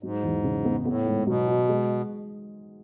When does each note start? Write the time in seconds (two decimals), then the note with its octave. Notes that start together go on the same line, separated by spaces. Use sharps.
0.03 G#2 F#3
0.23 E2
0.44 C#3
0.65 B3
0.80 G#2
0.86 A2 B3
1.06 G#2
1.27 B2 F#3
1.48 F#4
1.69 G#3